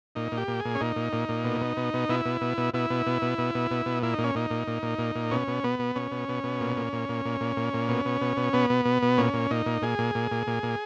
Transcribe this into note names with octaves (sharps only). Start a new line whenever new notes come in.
A#2 D#4
A#2
G4
A#2
G#4
A#2
C#4
A#2 D#4
A#2
A#2
A#2
B2
B2
B2
B2
B2 E4
B2
B2
B2
B2 E4
B2
B2
B2
B2
B2
B2
B2
A#2 E4
D#4
A#2
C#4
A#2 D#4
A#2
A#2
A#2
A#2
A#2
B2 C#4
B2
B2 B3
B2
B2 C#4
B2
B2
B2
A#2
A#2
A#2
A#2
A#2
A#2
A#2
A#2
B2
B2
B2
B2
B2 B3
B2
B2
B2
A#2 C#4
A#2
A#2 D#4
A#2
A#2 G#4
A#2
A#2
A#2
A#2
A#2